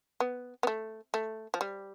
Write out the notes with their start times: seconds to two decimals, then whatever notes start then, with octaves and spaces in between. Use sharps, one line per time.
0.20 B3
0.63 B3
0.67 A3
1.14 A3
1.54 F3
1.61 G3